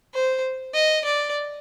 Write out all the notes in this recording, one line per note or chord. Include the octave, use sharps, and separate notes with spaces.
C5
D#5
D5